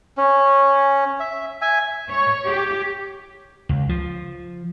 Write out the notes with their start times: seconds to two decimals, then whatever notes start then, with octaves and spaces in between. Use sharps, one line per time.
0.17 C#4
1.20 E5
1.62 E5 G#5
2.11 C#5
2.48 G4
3.69 C#2
3.89 F3